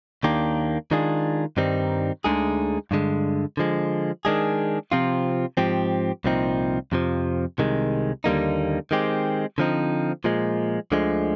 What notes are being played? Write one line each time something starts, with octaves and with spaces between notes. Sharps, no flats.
D#2 D#3 A#3 D4 G4
D#3 G#3 D4 F4 G#4
G2 D#3 G3 C4 D#4
D2 D3 G#3 D#4 G#4
G2 D3 G#3
D3 F3 G#3
D#3 G#3 D4 G#4
C3 F3 C4 F4
G#2 F3 C4 G4
C2 A#2 F3 C4 D#4
F2 C3 F3
C2 C3 D#3 G#3
D#2 D3 G3 A#3 D#4
D#3 G#3 C4 G4
D3 F3 C4 D#4
A#2 F3 G#3
D2 D3 F3 G#3